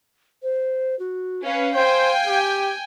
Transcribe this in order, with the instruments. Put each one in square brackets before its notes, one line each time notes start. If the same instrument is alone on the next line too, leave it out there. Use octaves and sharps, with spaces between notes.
[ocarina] C5
F#4
[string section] C#4 B4 [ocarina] F5
[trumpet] C5 [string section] G5 G#5
[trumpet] G4